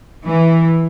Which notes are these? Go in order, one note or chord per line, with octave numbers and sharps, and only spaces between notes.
E3